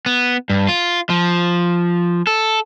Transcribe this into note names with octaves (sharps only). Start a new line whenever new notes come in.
B3
G2
F4
F3
A4